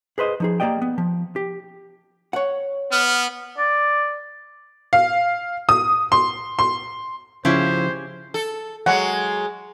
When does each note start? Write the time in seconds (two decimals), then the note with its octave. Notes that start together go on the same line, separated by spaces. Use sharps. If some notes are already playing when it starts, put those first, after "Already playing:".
0.18 G#4 B4 C5 D#5
0.40 F3 D#4 G#4
0.60 A#3 G4 D5 D#5 G5
0.82 B3
0.98 F3
1.36 G4
2.33 C#5 F#5
2.91 B3 F6
3.58 D5
4.93 F5
5.69 D#6
6.12 C6
6.59 C6
7.45 C#3 F3 C#4 E4 G4 C5
8.34 A4
8.86 F#3 G#3 F#5